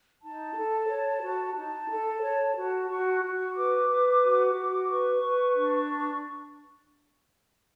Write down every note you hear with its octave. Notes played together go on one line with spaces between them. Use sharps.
D#4 A5
A4
C#5
F#4
D#4 A5
A4
C#5
F#4
F#4 C#6
C#6
F#4
C#6
B4 D6
B4
F#4
F#4
B4 C#6
B4
D4